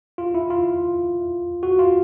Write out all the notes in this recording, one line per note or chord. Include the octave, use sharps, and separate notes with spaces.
F4
E4
F4
F#4
F4